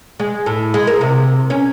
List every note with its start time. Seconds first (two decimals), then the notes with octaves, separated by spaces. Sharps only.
0.20 G#3
0.46 A2
0.74 G#3
0.87 A#4
1.01 C3
1.50 C#4